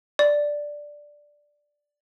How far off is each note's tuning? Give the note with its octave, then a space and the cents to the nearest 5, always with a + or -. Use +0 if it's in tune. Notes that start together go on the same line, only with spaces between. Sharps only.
D5 +0